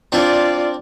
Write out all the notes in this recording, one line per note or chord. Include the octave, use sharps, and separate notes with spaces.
C4 D4 F4 D5